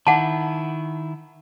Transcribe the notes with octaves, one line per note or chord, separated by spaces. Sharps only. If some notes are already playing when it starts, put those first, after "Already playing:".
D#3 E4 F#5 A5